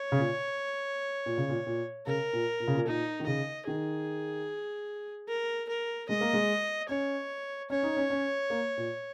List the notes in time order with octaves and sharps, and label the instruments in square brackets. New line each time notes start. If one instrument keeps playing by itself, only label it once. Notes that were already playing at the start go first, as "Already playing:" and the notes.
Already playing: [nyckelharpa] C#5
[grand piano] C#3
A#2
A#2
C#3
A#2
A#2
[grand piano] C#3 [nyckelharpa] A#4
[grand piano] A#2
A#2
C#3
A#2
[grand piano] A#2 [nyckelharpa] D#4
[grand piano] D#3
[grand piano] C#3 [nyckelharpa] D#5
[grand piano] D#3 [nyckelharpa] G#4
[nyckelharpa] A#4
A#4
[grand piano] G#3 [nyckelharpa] D#5
[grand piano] A#3
G#3
[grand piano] C#4 [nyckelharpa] C#5
[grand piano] C#4 [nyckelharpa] C#5
[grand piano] D#4
C#4
C#4
A#3
A#2